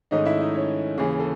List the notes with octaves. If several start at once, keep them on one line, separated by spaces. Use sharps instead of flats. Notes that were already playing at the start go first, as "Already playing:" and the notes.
G#2 D#3 A3 C#4 D#4 D#5
E4 E5
D#4 D#5
C#4 C#5
D#2 C#3 E3 G#4
A4